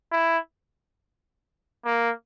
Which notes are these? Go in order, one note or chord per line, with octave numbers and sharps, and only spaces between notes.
E4
A#3